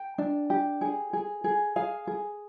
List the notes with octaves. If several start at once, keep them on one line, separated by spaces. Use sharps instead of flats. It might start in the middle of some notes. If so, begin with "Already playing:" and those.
Already playing: G5
D4
G4
G#4
G#4
G#4
G#4 F5
G#4